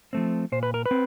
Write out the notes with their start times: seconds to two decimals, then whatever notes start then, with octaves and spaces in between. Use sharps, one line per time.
0.13 F3 A3 C4
0.52 A#2 C5
0.63 B4
0.74 A#4
0.86 B4
0.91 C4